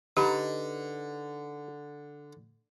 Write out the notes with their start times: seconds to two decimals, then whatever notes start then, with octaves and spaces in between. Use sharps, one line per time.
0.17 D3 D#4 G4 B4